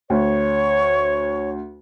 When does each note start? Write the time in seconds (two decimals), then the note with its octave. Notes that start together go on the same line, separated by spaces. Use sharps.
0.10 D2 C#5